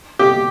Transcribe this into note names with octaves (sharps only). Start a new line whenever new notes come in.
G4